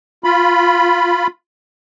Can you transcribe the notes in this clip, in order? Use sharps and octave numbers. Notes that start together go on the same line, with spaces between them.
F4 B5